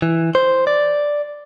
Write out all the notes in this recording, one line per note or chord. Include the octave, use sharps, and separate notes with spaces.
E3
C5
D5